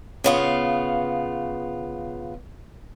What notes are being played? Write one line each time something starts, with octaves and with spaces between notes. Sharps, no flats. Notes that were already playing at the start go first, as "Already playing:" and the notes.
C#3 B3 F4